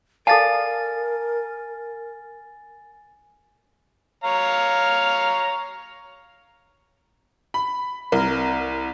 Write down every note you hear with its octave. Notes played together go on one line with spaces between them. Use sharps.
A4 A#4 D5 F5 G#5 A5 A6
C#5 F5 A#5
B5
C2 A#4